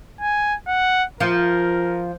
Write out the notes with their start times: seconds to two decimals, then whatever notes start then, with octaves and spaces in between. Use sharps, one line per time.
0.21 G#5
0.67 F#5
1.20 F3 A#4